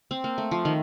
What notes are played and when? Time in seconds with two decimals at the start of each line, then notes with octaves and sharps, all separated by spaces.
0.11 C4
0.24 A#3
0.38 A3
0.51 F3
0.65 D#3